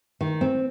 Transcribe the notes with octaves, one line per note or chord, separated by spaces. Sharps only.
D#3
C4